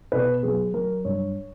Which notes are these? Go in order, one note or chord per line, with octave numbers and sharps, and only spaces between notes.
B2 B4
F#3 G#4
F#3 A#4
G2 C#5